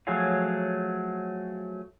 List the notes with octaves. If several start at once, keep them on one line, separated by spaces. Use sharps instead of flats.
F3 F#3 A3 G#4 C#5 F5